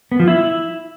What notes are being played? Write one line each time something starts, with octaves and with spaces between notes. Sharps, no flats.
B3
F3
E4